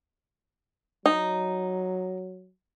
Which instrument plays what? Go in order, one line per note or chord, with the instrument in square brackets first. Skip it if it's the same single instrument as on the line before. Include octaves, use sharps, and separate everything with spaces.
[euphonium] F#3 [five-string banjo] D#4